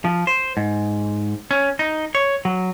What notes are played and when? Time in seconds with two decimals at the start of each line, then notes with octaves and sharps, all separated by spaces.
0.05 F3
0.27 C5
0.57 G#2
1.51 C#4
1.79 D#4
2.15 C#5
2.45 F#3